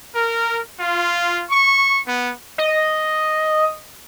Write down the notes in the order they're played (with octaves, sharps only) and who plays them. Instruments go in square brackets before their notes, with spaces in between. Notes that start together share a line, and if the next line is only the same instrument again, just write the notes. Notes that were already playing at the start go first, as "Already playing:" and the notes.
[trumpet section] A#4
F4
C#6
B3
[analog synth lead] D#5